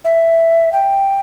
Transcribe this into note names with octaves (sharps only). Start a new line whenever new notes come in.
E5
G5